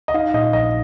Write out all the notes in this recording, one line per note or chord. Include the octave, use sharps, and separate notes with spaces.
D#5
D#4 F5
A#2 D#5
A#1 D#5